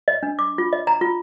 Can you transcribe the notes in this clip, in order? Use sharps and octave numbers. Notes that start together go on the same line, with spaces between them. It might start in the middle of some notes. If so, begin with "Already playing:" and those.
D#5
D4
D6
F4
D#5
A#5
F4